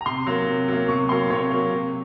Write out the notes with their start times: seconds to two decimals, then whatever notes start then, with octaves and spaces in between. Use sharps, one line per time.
0.01 A#5
0.06 C3 C6
0.27 F#3 A#3
0.47 C3
0.68 F#3 A#3
0.88 C3 C#6
1.09 F#3 A#3 C6
1.30 C3 C#5
1.50 F#3 A#3
1.72 C3